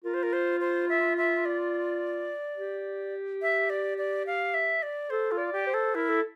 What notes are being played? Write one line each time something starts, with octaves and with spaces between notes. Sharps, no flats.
F4 A#4
C5
A#4
C5
C5
E5
E5
D5
G4
E5
D5
D5
F5
E5
D5
A4 C5
F4
D5
G4
C5
A4
E4 A#4
A4